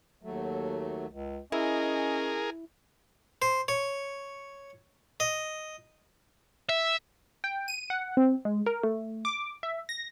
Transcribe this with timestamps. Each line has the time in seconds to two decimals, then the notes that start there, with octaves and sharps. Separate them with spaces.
0.23 D#2 F#3 A3
1.10 C#2
1.52 C#4 E4 G#4 A#4 D#5
3.42 C5
3.68 C#5
5.20 D#5
6.69 E5
7.44 G5
7.68 D#7
7.90 F#5
8.17 C4
8.45 G#3
8.66 A#4
8.83 A3
9.25 D6
9.63 E5
9.89 A#6